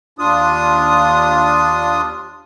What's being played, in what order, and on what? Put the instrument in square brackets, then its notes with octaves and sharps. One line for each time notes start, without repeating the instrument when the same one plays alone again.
[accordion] D#2 D4 F4 D#6